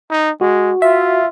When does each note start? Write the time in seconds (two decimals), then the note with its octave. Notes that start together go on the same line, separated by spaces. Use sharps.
0.10 D#4
0.41 G#3 F#4
0.82 F4 E5